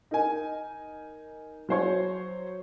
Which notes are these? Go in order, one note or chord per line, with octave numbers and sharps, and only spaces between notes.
D#4 A#4 G#5
F#3 C5 C#5